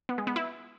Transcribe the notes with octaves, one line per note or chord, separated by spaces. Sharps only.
B3
G#3
B3
E4